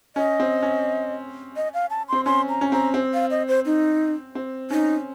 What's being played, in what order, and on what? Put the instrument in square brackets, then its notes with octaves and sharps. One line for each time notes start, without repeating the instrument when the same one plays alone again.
[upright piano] C#4 [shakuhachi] D#5
[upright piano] C4
C#4
[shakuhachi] D#5
F5
A5
[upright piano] C4 [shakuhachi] C6
[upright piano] C#4 [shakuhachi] C6
[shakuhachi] A#5
[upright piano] C#4
[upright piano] C4 [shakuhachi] A#5
[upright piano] C4
[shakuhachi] F5
D#5
C5
D#4
[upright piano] C4
[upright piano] C#4 [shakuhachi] D#4